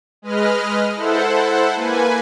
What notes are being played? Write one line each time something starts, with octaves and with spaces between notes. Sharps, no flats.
G#3 B4 D#5 F6
E4 A4 C5 F#5
A#3 B4 G#5